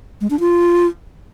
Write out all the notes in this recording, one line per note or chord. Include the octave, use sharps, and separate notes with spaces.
G#3
D4
F4